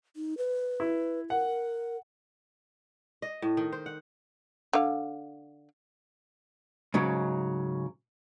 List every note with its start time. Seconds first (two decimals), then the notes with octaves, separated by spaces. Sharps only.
0.16 D#4
0.38 B4
0.80 E4
1.30 A#4 F#5
3.22 D#5
3.42 A2
3.57 D#3
3.72 C5
3.86 F#5
4.73 D3 F5
6.94 G#2 C#3 F#3